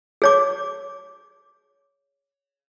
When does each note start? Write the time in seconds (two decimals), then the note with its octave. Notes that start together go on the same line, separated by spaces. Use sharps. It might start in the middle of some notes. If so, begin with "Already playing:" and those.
0.22 G#4 C#5 D6